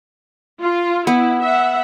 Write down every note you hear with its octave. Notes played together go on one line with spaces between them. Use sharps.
F4
B3 E4
E5 F#5